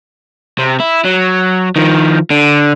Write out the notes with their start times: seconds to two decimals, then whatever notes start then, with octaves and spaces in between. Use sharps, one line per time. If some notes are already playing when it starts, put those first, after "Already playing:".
0.59 C3
0.80 E4
1.05 F#3
1.76 D#3 F3
2.30 D3